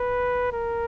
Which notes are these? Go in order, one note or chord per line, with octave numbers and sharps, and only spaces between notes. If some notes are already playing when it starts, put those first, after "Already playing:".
Already playing: B4
A#4